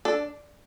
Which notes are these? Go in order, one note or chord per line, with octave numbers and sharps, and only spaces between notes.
D4 A4